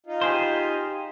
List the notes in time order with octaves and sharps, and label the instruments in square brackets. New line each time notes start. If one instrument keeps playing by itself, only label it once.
[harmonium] D#4 F4
[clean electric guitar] G4 G#4 C5